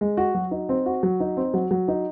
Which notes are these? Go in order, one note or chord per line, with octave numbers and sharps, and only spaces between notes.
G#3
F#4
F#3
D#4
C4
F#4
F#3
D#4
C4
F#3
F#3
D#4